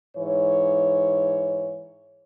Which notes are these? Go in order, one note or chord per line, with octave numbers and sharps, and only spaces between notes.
G#2 E3 C#5